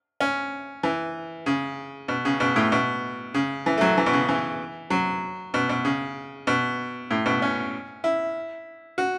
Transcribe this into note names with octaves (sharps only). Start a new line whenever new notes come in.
C#4
E3
C#3
B2
C#3
B2
A2
B2
C#3
E3
A3
F#3
E3
B2
C#3
E3
F#3
B2
B2
C#3
B2
A2
B2
C#4
E4
F#4